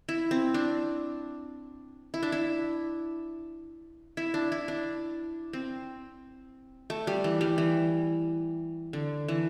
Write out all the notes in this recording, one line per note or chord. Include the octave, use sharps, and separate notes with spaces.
E4
C4
D4
E4
D4
E4
E4
D4
E4
D4
C4
A3
G3
E3
G3
E3
D3
E3